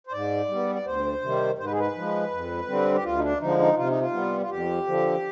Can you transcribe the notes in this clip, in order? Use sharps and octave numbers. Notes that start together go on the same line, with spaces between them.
C5
G#2 D5
G3 B3
D5
D2 C5
C3 D#3 G3
G#2 C5
B4
G#4
B4
F3 G#3
F2
D3 G3 C4
G4
D2 F4
D#4
D4
D3 F3 G#3 D#4
D#4
C3 F4
D#4
F4
G3 B3
F4
F2 G4
D3 F3